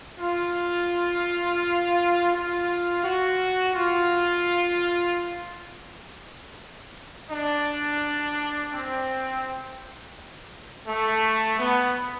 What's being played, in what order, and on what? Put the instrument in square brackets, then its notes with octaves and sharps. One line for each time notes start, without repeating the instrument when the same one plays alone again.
[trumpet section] F4
F4
F#4
F4
D4
C4
A3
B3